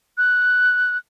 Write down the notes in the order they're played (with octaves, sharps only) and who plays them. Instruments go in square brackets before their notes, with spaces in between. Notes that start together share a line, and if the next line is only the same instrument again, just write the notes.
[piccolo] F#6